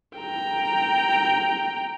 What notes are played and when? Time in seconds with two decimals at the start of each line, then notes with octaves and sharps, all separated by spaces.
0.18 G5 A#5